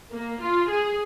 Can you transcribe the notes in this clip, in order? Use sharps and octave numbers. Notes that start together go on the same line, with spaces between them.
A#3
F4
G#4